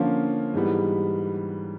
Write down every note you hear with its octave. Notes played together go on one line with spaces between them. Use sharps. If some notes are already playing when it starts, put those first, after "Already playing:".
Already playing: D3 F3 A#3 C#4 F4
G#2 E3 G3 B3